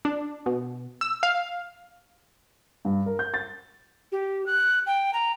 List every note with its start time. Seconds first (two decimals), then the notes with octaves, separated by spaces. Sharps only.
0.05 D4
0.46 B2
1.01 E6
1.23 F5
2.85 G2
3.06 A#4
3.19 G6
3.34 A6
4.12 G4
4.46 F#6
4.87 G5
5.13 A#5